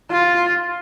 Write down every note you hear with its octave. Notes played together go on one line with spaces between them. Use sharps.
F4